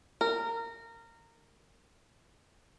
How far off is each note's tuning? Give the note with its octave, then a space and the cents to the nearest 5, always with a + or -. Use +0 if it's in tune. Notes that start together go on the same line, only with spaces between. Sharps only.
A#4 -20